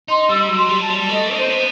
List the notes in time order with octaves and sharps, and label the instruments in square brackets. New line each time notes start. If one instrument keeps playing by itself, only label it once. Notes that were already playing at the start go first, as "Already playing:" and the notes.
[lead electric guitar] D#4 [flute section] C6
[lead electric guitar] G3 [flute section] E6
[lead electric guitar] F#3
[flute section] C6
[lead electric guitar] G3
[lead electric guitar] F#3 [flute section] A5
[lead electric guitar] G3
[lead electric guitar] A3 [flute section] D#5
[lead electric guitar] D#4 [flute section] C5
[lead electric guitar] C4
B3